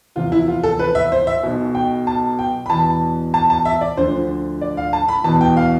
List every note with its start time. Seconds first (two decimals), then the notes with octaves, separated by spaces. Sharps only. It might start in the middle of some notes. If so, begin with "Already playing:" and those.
0.16 E2 C3 F3 F4
0.32 E4
0.48 F4
0.64 A4
0.79 B4
0.95 E5
1.12 C5
1.27 E5
1.43 B1 B2
1.75 G5
2.07 A5
2.39 G5
2.66 B5
2.70 E2 B2 A5
3.34 A5
3.50 A5
3.65 E5
3.81 D5
3.97 D2 D3 F3 C5
4.61 D5
4.77 F5
4.93 A5
5.08 B5
5.24 E2 B2 A5
5.41 G5
5.57 F5